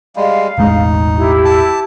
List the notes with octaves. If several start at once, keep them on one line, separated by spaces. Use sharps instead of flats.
G3 G#3 F5
E1 A1 G#3 D#4
E4 G4
A5